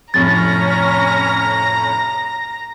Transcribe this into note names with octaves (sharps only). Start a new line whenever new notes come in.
F2 A2 C3 C#4 A#5 A6 A#6